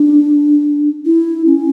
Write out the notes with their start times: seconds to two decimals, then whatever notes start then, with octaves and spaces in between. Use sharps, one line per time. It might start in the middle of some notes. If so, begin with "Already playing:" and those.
Already playing: D4
1.05 E4
1.46 C#4